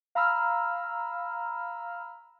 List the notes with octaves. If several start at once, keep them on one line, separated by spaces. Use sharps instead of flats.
F5 A#5 B5 E6 F6